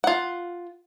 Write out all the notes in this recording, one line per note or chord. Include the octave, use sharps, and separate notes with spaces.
F4 F#5